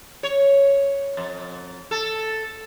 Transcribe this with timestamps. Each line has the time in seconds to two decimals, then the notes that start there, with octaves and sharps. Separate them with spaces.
0.23 C#5
1.17 F2
1.91 A4